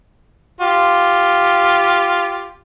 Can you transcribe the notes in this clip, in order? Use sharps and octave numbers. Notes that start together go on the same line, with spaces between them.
F4 G4